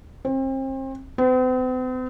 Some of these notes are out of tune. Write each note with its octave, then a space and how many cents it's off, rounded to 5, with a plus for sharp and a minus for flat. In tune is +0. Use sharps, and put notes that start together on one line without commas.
C4 +35
C4 -45